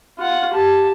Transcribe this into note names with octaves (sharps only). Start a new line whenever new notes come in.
F4 F#5
G4 A5